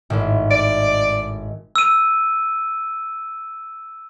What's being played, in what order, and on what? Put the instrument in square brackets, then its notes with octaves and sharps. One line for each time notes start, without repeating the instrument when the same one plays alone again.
[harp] G#1 A2
[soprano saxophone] D5
[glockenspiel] E6 D#7